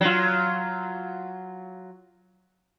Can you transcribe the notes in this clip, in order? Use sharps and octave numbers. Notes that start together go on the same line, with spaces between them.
F#3 F4